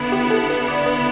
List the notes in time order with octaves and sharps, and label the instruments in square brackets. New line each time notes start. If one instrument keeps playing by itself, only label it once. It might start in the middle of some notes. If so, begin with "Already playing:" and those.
Already playing: [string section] D3 B3 E4 [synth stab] B4
[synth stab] G4
A4
B4
D5
B4